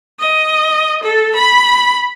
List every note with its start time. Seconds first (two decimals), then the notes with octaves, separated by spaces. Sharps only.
0.20 D#5
1.03 A4
1.35 B5